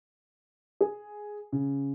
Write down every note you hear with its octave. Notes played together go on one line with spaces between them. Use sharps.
G#4
C#3